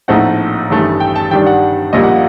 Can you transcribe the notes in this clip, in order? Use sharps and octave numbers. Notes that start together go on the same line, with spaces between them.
A#1 A2 A3 C4 D#4 F#5
A1 G2 D#3 A3
G5
A5
G2 D#3 G3 D4 G5
F#5
A#1 A#2 G3 A#3 D#5
F#5